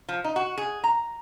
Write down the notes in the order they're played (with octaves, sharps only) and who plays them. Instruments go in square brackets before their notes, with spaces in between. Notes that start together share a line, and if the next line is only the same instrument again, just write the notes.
[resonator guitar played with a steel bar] F3
D#4
F#4
G#4
A#5